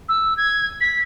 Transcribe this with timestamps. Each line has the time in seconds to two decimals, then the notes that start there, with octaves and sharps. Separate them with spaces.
0.08 E6
0.37 G#6
0.80 B6